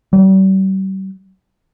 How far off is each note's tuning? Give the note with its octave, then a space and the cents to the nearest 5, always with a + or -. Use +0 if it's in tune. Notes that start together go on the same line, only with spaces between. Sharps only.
G3 -40